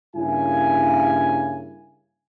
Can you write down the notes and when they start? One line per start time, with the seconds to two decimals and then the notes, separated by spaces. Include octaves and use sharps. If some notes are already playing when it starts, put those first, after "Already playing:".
0.15 G2 C#3 A#3 E4 G#5